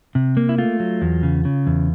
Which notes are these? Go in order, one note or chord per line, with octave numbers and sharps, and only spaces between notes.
C3
A#3
E4
A3 F4
F#3
E2
C#3
C#3
E2